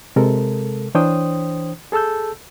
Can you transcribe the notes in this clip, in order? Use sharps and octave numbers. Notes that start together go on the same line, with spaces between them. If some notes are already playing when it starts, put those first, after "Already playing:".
C3 G#3 A4 A#4
E3 D4 C5 C#5 G5 D#6
G#4 A4 A5 E6 G6